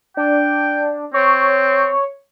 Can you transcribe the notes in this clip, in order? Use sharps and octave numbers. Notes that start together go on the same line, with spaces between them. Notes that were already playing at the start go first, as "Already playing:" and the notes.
D4 G5
C4 C#5